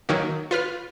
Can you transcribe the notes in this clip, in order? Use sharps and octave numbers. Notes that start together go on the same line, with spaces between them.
D#3 F#3 A#3
F4 B4 F6